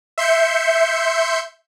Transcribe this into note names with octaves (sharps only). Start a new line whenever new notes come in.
E5 C6 G6 C#7